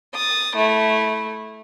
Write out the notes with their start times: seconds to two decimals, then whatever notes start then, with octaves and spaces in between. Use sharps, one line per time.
0.15 D#6 A6
0.56 A3 E4